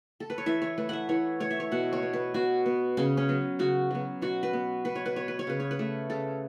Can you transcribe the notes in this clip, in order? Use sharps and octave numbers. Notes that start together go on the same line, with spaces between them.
A4
B4
C#5
E3 E5
C#5
A3 B4
E5 F#5
E3 C#5
A3 C#5
E5
C#5
B2 F#5
C#5
B3
B4
B2 F#4
B3
C#3 C#4
C#4
F#3 B3
C#3 F#4
F#3 B3
B2 F#4
B4
B3
B2 B4
C#5
B4
B3 C#5
B4
C#5
C#3 B4
C#5
B4
A3
C#3 A4